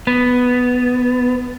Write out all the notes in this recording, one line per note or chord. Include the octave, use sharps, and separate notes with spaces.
B3